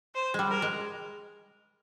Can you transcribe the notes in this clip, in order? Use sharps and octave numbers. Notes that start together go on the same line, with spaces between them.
C5
G3 G#3
A#4
G#3